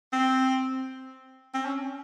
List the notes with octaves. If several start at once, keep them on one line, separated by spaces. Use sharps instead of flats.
C4
C4
C#4